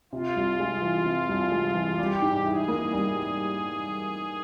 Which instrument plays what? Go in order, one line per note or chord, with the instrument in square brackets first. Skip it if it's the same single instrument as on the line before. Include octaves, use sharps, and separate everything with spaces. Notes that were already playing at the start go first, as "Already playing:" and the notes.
[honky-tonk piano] C3 [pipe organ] F4
[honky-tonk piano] C2
G#3
E3
C3
C2
G#3
E3
[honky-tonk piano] G3 [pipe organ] G4
[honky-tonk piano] G#2
[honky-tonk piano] E4 [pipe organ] G#4
[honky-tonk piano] A#3
G3